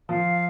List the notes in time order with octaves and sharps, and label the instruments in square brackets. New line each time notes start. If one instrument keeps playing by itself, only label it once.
[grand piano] F3 [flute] F5